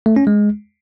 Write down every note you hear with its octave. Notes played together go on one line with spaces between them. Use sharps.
A3
C#4
G#3